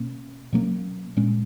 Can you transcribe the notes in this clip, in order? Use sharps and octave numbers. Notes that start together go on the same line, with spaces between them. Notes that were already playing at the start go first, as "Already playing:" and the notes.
Already playing: B2 A#3 C#4
B2 F#3 A#3 C#4
A#2 G#3 C#4